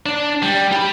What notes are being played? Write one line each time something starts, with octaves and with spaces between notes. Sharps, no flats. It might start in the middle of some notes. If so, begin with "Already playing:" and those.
D4
G3
G4 B5